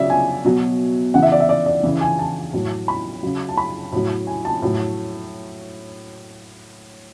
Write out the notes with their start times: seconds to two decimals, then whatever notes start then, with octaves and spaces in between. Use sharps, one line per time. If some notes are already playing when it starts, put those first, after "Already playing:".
Already playing: C#3 F#3 D5 E5
0.10 G#5
0.44 B2 F#3
1.14 C#3 E3 F#5
1.23 E5
1.32 D5
1.40 E5
1.49 D5
1.66 D5
1.83 C#3 E3
2.01 G#5
2.19 A5
2.53 A2 F#3
2.88 B5
3.23 C#3 F#3
3.49 A5
3.57 B5
3.92 A2 F#3
4.27 G#5
4.45 A5
4.62 A2 F#3